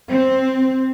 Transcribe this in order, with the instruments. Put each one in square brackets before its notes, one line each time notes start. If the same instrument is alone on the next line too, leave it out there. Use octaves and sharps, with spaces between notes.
[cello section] C4